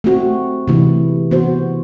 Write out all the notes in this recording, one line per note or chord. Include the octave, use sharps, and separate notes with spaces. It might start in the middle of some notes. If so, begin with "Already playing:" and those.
A3 C4 F#4
C3 E3 A3 E4
E3 B3 F#4 C5